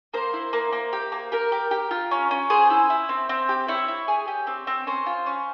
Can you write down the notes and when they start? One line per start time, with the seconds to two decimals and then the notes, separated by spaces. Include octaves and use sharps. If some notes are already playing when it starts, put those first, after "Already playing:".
0.14 A#3 C5
0.33 E4
0.53 A#3
0.73 A#3
0.93 G4
1.12 A#3
1.32 G4 A#4
1.52 G4
1.71 G4
1.91 F4
2.11 C#4
2.31 C#4
2.50 G#4 C5
2.70 E4
2.90 E4
3.09 C4
3.29 C4
3.49 G4
3.68 E4 C#5
3.88 E4
4.08 G#4
4.28 G4
4.47 C4
4.67 C4
4.87 C#4 C5
5.06 F4
5.26 C#4